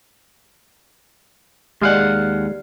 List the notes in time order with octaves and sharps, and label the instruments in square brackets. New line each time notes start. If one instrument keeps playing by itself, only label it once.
[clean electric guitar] D#2 F5 F#5 [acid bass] G#3 [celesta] G4 D5